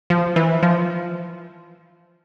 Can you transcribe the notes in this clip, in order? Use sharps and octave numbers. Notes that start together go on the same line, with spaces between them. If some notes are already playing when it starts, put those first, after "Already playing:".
F3
E3
F3